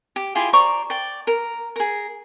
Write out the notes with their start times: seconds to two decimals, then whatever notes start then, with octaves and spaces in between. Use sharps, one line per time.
0.16 G4
0.35 E4 F4 G4 G#4
0.53 C5 D5 A#5 C#6
0.90 D5 G5
1.27 A#4
1.76 G#4 A#4